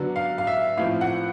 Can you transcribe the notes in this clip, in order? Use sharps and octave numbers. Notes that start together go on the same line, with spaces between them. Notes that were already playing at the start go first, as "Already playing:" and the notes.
Already playing: D3 F#3 B3
F5
F5
E5
A2 F3 A3 C4 F5
F#5